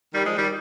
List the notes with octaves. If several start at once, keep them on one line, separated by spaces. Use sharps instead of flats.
D#3 G3
F3 G#3
D#3 G3